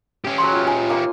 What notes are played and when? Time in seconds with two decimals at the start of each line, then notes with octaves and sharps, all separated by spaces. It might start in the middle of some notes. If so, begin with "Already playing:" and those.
0.25 C#4 G4
0.38 F#3 G#4 B5 C6
0.52 F4
0.67 D#4 F4 G#5
0.89 A#3 D#4 C6